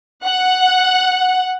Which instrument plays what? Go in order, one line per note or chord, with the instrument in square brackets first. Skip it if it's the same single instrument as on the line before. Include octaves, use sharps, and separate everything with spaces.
[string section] F#5